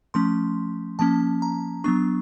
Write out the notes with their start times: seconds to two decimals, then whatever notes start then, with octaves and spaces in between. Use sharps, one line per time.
0.14 F3 A3 C#4 C6
0.99 F3 A#3 C#4 A5
1.42 A#5
1.84 F#3 B3 D4 C#6